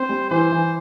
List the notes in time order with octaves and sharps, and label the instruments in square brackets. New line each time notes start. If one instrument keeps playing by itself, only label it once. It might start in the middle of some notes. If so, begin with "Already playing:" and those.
Already playing: [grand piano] C4 [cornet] C5
[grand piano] G3
[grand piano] E3 [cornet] C5
[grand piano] E3